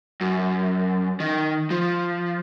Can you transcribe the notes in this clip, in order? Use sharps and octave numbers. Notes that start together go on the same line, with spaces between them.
F#2
D#3
F3